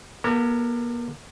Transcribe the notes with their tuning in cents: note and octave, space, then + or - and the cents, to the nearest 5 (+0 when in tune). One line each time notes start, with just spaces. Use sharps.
A#3 +45 G4 +0 A#4 -45